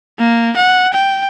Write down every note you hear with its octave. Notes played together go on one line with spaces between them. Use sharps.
A#3
F#5
G5